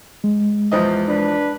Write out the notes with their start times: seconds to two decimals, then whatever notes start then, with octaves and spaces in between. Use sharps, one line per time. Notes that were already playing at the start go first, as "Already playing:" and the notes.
0.24 G#3
0.72 E2 F3 D#5
1.08 D4 B4